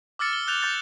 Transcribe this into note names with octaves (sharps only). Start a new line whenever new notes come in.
D6 E6 F6 A6 C#7
G7
F#6 G6 A6 F7 G7
D6 G6 A6